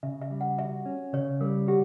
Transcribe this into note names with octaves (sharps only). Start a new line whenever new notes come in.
C#3 E5
E5
G3
F#5
F#4 E5
C#4
C#3 C#5
G3 A#4
F#4 G4